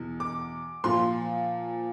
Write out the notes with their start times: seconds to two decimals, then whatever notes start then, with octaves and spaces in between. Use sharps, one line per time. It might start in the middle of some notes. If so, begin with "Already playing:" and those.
Already playing: E2 B2
0.20 D6
0.84 A#2 F3 C6